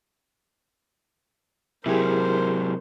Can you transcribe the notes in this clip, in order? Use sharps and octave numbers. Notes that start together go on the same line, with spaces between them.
C3 F#3 E4 G4 G#4 A#4 C5